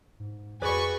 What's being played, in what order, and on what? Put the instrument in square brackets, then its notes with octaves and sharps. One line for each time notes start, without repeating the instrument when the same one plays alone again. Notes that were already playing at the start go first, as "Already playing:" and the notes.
[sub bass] G#2
[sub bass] F2 [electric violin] F#4 G#5 [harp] G#4 B4 D5 [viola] B5 C#6